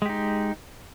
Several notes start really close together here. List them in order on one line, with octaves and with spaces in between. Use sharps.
G#3 G4 D#4